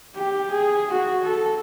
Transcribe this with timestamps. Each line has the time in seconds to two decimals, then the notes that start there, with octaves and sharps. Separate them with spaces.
0.15 G4
0.51 G#4
0.91 F#4
1.23 A4